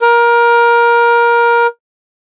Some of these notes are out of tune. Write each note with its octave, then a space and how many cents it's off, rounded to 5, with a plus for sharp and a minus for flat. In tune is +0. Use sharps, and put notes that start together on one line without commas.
A#4 +20